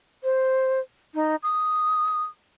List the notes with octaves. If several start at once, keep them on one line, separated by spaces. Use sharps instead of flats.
C5
D#4
D#6